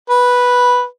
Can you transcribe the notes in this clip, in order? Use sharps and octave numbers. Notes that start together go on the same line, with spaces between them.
B4